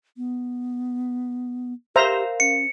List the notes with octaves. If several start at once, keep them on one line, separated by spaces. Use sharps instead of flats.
B3
G4 A#4 C5 E5 F5 A#5
C#4 C#7